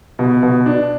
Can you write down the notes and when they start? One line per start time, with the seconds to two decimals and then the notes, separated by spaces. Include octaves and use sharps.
0.19 B2
0.43 B2
0.66 D4